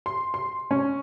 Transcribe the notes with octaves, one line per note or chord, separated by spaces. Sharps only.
C6
C6
C#4